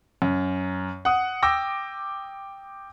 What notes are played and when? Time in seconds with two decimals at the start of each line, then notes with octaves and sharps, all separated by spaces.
0.22 F#2
1.05 F#5 D#6
1.43 G5 D6 E6 A#6